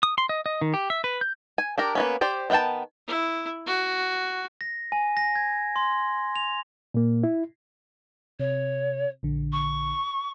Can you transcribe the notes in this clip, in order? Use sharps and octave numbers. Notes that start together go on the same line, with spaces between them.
D#6
C6
D#5
D#5
D#3
G4
E5
B4
G6
G#5
D4 G4 A#4
A#3 B3 C#4
G4 C5 D5
D#3 B3 F4 G5 A5
E4
F#4
A#6
G#5
A#6
G#6
C6
F7
A#2 A#3
E4
C3 C#5
A#1 D3
C#6